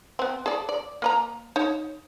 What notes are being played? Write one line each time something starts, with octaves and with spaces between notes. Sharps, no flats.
B3 C4
G#4 A4 D5
D5
A#3 B4 A#5
D#4 C#5